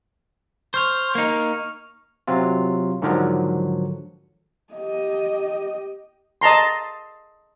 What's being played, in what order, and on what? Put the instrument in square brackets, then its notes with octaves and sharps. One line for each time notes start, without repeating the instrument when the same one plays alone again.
[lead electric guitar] C5 [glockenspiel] C#6 F6 F7
[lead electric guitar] A#3 D#4
[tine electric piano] C3 F#3 C4 F4
G#2 D3 D#3 F3 F#3
[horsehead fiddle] G4 D#5
[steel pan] D#5 A5 A#5 C6